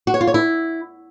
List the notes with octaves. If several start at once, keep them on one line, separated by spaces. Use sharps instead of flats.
F#4
C#5
F4
C#5
E4